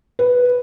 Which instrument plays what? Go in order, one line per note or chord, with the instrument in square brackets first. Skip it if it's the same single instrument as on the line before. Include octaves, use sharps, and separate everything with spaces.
[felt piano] B4